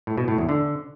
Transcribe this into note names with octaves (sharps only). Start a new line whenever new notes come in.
A2
B2
A2
E2
D3